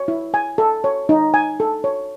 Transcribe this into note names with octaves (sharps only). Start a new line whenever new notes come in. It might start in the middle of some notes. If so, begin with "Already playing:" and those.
Already playing: C#5
E4
G#5
A4
C#5
D#4
G#5
A4
C#5